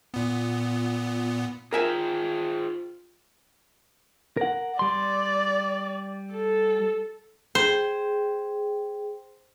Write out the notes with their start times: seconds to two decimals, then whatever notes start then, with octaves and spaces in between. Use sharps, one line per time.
0.14 A#2 B3
1.73 F4 G#4 A#4 C5 E5 G5 G#5
4.37 A#4 F#5
4.79 G3 D5 C6
6.33 A4
7.55 G#4 C5 G5